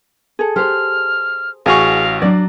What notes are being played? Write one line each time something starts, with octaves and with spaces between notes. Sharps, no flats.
G#4 A4
G4 C5 F6
A1 F#4 G#4 F5 G#5 C#6
F#3 D4 D5